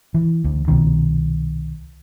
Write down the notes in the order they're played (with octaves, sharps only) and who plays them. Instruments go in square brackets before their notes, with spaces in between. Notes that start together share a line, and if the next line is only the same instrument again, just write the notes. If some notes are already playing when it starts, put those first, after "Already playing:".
[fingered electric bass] E3
D2
C2 B2 D#3